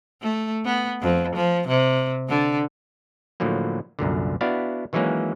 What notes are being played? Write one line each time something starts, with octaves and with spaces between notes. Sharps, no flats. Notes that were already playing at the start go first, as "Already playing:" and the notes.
A3
B3
F2
F3
C3
D3
A2 D3 F3 F#3 A#3
C2 F#2 A#2 D3
B3 D4 E4 F#4 D5 F5
D#3 E3 F#3 G#3 A#3 C#4